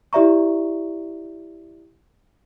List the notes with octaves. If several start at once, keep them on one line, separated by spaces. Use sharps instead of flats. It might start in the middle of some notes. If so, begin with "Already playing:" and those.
E4 G4 D5 E5 A#5 C#6